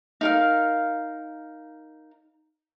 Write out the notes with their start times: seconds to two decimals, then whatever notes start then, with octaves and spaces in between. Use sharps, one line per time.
0.21 D#4 A#4 F5